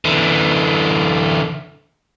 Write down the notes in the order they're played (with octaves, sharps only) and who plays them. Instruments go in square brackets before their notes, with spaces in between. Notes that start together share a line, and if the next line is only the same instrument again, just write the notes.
[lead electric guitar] D3 E3